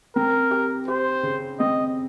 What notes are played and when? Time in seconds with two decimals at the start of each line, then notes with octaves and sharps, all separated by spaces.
0.16 C4 A#4
0.51 G4
0.88 G4 C5
1.23 C#3
1.60 C4 D#5